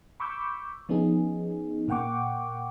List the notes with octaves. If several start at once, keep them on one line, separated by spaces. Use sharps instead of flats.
B5 C#6 D6 E6 G6
F3 B3 C#4 D#4 G#4
A#2 A#3 F#5 G5 C#6 D6